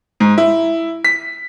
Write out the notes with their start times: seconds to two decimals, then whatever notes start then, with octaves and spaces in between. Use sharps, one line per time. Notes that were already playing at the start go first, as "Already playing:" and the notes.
0.20 G#2
0.38 E4
1.05 B6